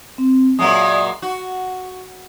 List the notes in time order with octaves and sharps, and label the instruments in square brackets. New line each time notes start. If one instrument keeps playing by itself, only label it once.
[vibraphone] C4
[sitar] A#2 F#3 G#3 [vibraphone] E5 D#6
[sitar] F#4 [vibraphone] F#5